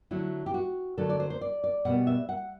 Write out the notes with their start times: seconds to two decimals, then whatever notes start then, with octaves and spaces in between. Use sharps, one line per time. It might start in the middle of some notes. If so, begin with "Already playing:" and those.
0.11 D3 F#3 A3 E4
0.46 G4
0.54 F#4
0.98 D3 F#3 A3 A4
1.09 D5
1.20 C5
1.30 C5
1.41 D5
1.64 D5
1.85 B2 G3 B3 F#5
2.07 E5
2.29 F#5